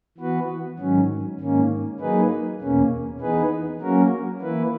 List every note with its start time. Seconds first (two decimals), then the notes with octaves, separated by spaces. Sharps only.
0.18 E3 B3 F#4 B4
0.79 G#2 D#3 F#3 C#4
1.40 G#2 D#3 A#3 C#4
2.00 F#3 A#3 D#4 G#4 B4
2.61 E2 B2 A#3 C#4
3.21 E3 B3 D#4 G#4 B4
3.81 F#3 A#3 C#4 F#4 A#4
4.41 E3 A#3 E4 B4